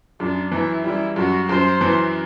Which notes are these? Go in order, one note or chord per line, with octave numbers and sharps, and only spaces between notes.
F#2 D4
E3 E4
G3 E4
F#2 F#4
F#2 C5
E3